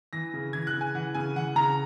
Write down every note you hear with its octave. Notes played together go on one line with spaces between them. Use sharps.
E3 A#6
C#3
E3 G#6
F#6
C#3
G#5
E3 F#5
C#3 G#5
E3 F#5
C#3 A#5